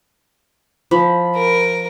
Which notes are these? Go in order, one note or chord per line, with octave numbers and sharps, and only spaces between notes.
F3 B5
A#4